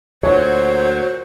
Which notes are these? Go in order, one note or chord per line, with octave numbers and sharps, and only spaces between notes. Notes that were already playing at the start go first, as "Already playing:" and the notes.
D2 A#2 F#3 C5 C#5